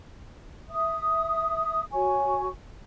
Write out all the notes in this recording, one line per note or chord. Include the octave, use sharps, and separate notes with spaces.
E5 D#6
F#4 C#5 G#5 C#6